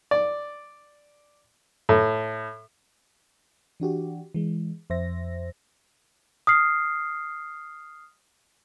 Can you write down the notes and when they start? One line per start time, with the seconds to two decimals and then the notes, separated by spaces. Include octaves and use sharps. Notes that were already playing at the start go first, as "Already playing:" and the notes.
0.11 D5
1.89 A2
3.80 E3 D4 F#4 G4
4.34 E3 G#3
4.90 F2 C5 E5 A#6
6.47 D#6 F6 C7